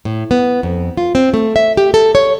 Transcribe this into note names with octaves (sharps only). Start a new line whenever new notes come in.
A2
B3
F2
F4
C4
A3
E5
G4
A4
C#5